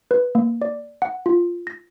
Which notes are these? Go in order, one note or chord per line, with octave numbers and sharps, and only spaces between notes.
B4
A#3
D5
F#5
F4
A#6